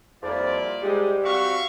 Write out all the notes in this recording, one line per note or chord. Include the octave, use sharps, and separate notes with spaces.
F2 G3 A#3 E4 F4 D5
G#2 G3 G#3 G4
C4 F#4 E5 F5 C#6